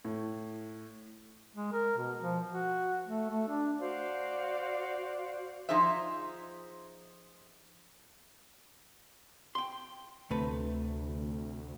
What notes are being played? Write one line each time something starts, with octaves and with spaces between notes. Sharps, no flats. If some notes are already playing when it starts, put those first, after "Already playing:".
A2
G#3
A#4
B2
F3
F#4
A3
A3
D4
F#4 C5 D5 F5
F3 D#4 G#4 C5 E5
G5 C6
D2 C3 A3 B4